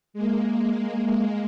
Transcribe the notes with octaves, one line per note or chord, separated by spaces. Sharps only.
G#3 A#3